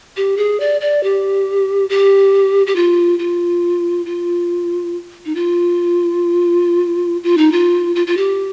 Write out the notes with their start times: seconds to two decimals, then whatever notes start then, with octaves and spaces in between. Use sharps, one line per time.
0.17 G4
0.37 G#4
0.60 D5
0.81 D5
1.03 G4
1.89 G4
2.67 G4
2.76 F4
3.19 F4
4.06 F4
5.25 D#4
5.35 F4
7.24 F4
7.38 D#4
7.52 F4
7.96 F4
8.07 F4
8.17 G4